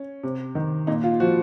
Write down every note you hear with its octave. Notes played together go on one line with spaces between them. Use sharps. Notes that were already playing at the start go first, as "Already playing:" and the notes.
Already playing: C#4
C3
D#3
A#2 D#4
F4
F3 F#4